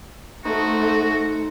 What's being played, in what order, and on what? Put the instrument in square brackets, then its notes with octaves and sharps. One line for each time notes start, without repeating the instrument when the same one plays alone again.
[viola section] A3 A4 [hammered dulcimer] D#4 C5 [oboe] F#4